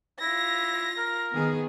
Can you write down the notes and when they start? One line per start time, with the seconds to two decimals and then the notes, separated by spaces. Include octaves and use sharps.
0.21 E4 F4 A#6
0.98 A#4
1.36 D#3 B3 G#4